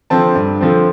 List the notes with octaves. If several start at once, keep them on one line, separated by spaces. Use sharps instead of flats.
D3 F3 C4 A5
G2
D3 F3 C4